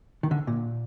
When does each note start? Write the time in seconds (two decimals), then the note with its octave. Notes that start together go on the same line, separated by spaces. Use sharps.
0.23 D#3
0.31 D3
0.47 A#2